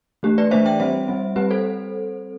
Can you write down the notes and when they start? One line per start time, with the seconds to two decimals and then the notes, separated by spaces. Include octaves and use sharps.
0.23 E3 A3 D4 G4
0.38 B4 D5
0.51 E3 A3 D4 C5 E5
0.66 E5 G5
0.80 G3 C4 C5 E5
1.08 G3 C4
1.36 G3 C4 G4 B4
1.51 A4 C5